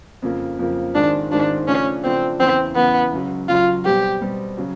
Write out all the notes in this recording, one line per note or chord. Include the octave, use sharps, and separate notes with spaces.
F2 C#3 F3 A#3
F2 C#3 F3 A#3
G#2 D#3 G#3 C4 D4 F4
G#2 D#3 G#3 C4 D4 F4
C#3 F3 A3 C#4 D4
C#3 F3 A3 C4 D4
E2 C#3 E3 C4
E2 C#3 E3 B3
C#2 C#3 F#3
C#2 C#3 F#3 F4
B2 G3 C4 G4
B2 G3 C4
C#3 F#3